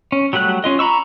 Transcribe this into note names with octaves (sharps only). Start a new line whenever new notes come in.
C#4
F#3 G3 A3 F#5 F#6
C#4 F4 D#5
A#5 B5 C#6 E6